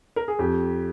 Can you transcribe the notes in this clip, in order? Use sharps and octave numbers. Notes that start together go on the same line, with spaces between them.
A#4
G#4
F2 G4